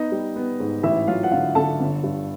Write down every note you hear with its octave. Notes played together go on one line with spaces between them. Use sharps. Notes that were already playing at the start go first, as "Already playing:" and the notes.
Already playing: B3 D#4 D#5
G3
B3
G#2
A1 E4 E5
F#3 F4 F5
F#5
D3 F4 F5
D3 A4 A5
G1
G2